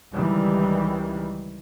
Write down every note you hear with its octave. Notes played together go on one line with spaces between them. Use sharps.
C#2 D#3 E3 G3